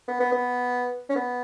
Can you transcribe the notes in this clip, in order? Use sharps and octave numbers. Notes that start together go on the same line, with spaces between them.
B3
B3
B3
C#4
B3